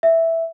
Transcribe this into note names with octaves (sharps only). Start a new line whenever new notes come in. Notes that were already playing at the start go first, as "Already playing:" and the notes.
E5